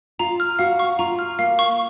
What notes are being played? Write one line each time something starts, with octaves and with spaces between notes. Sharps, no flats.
F4 A#5
F6
F#4 F5
C#6
F4 A#5
F6
A#3 F5
C#6